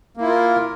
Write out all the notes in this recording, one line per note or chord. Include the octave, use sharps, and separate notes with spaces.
A#3 E4 F4 A#4